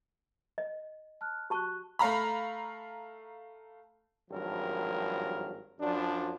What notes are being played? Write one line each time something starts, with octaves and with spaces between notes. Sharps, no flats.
D#5
A5 F6 F#6
F#4 G4 A5 C#6 F#6
A3 F5 A#5 B5
G#1 G2 F3 F#3 A#4
F#2 F3 D4